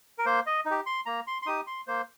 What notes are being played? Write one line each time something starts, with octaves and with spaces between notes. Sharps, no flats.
A#4
A#3 C5
D#5
D#4
G4
C6
A#3 A#5
C6
C6
D#4 G4 D#6
C6
A#3 C5